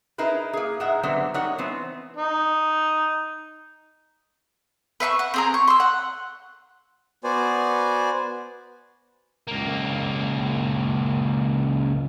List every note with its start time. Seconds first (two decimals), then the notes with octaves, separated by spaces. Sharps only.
0.18 D#4 E4 G#4 A#4 B4
0.53 A#3 G#4
0.80 G#2 G#3 E5 F#5 A#5
1.03 D3 F#3 G3 B3 C4
1.34 G3 D#4 A#4 C#5 F#5
1.58 E3 B3 C4
2.17 D#4
5.00 B4 E5 C6 C#6
5.19 F#5
5.34 C4 G#4 A#4
5.54 C#6
5.68 C6 E6
5.80 F#5
7.24 B3 F#4 C5 D5 G#5
9.47 C#2 A#3